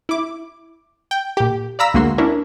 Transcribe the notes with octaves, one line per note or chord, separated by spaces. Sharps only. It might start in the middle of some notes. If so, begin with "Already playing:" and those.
E4 D6
G5
A#2 G4
D5 F5 A#5 B5 E6 B6
D2 G#3 A#3 F#4 C6
C#4 D4 E4 A#4